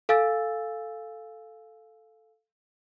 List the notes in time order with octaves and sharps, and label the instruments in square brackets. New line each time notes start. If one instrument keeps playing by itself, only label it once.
[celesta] A4 F5 G#5 E6 A6